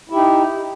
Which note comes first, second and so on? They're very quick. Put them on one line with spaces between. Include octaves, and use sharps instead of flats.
E4 G4 D#4